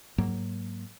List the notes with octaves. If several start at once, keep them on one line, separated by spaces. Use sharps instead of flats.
G#2 F#3 A#3